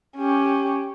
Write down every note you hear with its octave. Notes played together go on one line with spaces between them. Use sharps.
C#4 G4